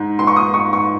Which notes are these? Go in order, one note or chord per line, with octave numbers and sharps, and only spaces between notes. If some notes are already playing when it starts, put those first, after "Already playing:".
Already playing: G#2
C6
C#6
D#6
C#6
C#6